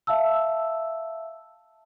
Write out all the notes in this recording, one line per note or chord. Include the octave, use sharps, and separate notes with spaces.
E5 F5 A5 E6